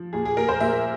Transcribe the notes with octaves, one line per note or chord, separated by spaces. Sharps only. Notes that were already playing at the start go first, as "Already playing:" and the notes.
Already playing: F3
A#2 G#4
G#4
A#2 A#4
C5
A#2 E5